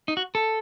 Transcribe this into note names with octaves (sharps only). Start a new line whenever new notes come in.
D#4
F#4
A4